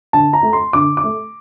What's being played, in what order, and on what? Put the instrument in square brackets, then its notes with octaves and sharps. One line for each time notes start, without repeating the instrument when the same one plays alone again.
[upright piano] D3 A5
A#5
A3
C6
D3 D6
D6
A3